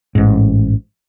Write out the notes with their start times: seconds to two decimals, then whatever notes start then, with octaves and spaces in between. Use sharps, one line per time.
0.15 A1 G#2